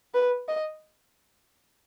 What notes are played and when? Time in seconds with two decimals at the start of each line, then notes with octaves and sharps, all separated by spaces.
0.14 B4
0.48 D#5